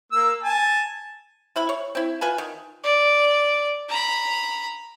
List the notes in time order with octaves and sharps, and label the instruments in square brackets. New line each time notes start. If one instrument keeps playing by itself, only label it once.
[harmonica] A#3 E6
G#5 A5
[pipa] C3 E4 B5
C#5
C4 E4
F4 B4 G#5 A5
D#3
[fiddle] D5
A#5 B5